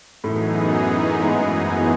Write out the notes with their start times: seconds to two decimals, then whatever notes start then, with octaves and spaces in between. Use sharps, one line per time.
0.24 F#2 A2 E3 A3 B3 D#4 G#4
1.20 G#2 G#3